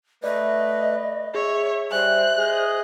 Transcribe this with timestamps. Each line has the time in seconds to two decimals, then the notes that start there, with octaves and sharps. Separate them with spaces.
0.24 A3 B4 D5 D#5
1.35 G#4 C#5 E5
1.92 G3 C5 E5 G#5 F#6
2.38 G#4 D#5